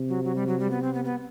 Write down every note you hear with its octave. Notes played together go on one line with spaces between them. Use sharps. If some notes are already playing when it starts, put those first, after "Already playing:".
Already playing: C3
F#3
F#3
G3
F#3
G3
B3
C4
B3
B3